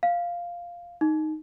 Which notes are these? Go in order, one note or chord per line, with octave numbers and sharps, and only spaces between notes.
F5
D#4